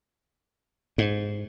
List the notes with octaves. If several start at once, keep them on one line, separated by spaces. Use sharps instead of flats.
G#2